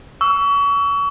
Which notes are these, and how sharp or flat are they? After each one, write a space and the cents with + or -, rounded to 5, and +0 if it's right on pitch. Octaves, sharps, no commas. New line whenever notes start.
C#6 +35 E6 +0